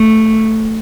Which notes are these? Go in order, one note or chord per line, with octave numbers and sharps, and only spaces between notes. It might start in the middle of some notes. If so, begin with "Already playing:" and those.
Already playing: A3